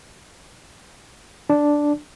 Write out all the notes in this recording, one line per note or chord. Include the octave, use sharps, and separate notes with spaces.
D4